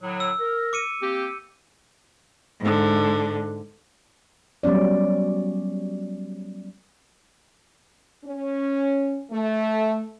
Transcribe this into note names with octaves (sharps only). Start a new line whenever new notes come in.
A2 D3 F#3
E6
A#4
D6 C#7 D#7
A#3 C4 G4
G#2 D3
F#3 G3 B3 C#4 D5
C#4
A3